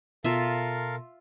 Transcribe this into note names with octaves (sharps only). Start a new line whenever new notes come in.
B2 F4 A4 A#4 E5 F5